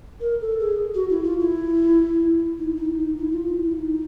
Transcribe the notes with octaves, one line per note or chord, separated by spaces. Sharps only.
A#4
A4
G#4
F#4
E4
F4
E4
D#4
E4
D#4
E4
D#4
E4
F4
E4
E4
D#4